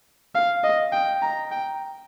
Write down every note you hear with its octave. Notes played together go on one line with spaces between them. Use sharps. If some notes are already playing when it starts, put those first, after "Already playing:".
F5
D#5
G5
A#5
G5